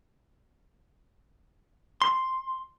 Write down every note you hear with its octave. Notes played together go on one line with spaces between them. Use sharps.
C6